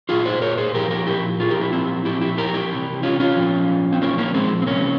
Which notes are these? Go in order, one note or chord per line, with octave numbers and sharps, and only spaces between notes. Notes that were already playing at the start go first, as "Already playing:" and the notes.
A#2 F3 F4 G#4
G#4 C5
A#4 C#5
G#4 C5
A#2 F3 G4 A#4
G4 A#4
E4 G4
A#2 F3 F4 G#4
G4 A#4
E4 G4
C4 E4
A#2 F3 E4 G4
E4 G4
G4 A#4
E4 G4
C3 E3
C#4 F4
C#4 F4
A#2 F3
C4
A#2 F3 A#3 C#4
A#3 C#4
G#3 C4
C4
C3 E3 A#3 C#4